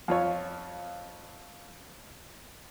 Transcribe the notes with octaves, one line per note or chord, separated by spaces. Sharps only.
F2 F4 C#5